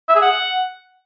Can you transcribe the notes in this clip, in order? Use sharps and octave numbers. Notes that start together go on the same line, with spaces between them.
E5
G#4
F#5